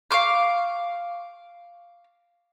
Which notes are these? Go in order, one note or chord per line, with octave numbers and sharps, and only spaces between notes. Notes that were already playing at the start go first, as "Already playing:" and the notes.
F5 C#6 D6 F6